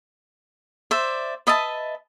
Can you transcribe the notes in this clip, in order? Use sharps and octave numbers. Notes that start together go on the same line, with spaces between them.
C5 D5 E5
B4 D#5 E5 A5